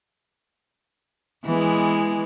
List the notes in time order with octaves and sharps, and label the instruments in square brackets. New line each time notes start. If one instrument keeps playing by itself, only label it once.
[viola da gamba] E3 G#3 B3